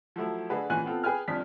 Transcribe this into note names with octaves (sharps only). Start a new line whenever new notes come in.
F3 F#3 A3 E4
D3 A3 G#4 B4
A#2 E3 C#4 G#5 F#6
B3 C4 F4 A4
G#4 B4 G5 G#5 F6
G1 F2 D4 B6